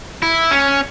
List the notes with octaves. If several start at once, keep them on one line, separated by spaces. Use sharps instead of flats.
E4
C#4